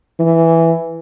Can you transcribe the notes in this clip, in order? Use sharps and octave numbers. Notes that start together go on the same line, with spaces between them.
E3